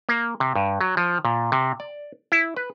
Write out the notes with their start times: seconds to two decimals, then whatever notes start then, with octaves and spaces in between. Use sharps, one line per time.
0.09 A#3
0.40 C3
0.56 G2
0.81 F#3
0.97 F3
1.25 A#2
1.52 C3
1.80 D5
2.32 E4
2.57 B4